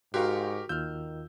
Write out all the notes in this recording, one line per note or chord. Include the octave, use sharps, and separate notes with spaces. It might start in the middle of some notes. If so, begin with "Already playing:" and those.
G#2 F#4 G4 A#4 F5 G5 C6 C#6
D#2 D#3 F4 E6 F6 G6